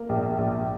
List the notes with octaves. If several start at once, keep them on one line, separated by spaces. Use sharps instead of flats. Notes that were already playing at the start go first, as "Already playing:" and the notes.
Already playing: A#3
A#1
A#1